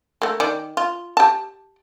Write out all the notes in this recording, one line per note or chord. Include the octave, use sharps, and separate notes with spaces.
A3 A#3
D#3 D5
F4
G4 A5